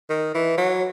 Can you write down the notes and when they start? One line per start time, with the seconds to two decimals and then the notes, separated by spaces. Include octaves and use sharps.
0.10 D#3
0.35 E3
0.58 F#3